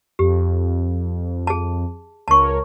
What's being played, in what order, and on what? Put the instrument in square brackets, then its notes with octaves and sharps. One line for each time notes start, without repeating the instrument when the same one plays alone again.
[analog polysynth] F2 [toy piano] G4
[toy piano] G#4 A5
[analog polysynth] C#2 A#4 C#5 [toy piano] A5 C#6